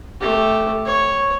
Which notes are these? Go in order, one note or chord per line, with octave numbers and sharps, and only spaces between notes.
A3 G4
C#5